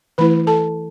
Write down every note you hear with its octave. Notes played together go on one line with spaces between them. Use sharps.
E3 A3 E4 B4 B5
A4 A5